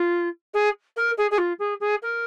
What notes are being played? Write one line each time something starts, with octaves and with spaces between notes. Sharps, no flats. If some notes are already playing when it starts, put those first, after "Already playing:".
Already playing: F4
G#4
A#4
G#4
G#4
F4
G#4
G#4
A#4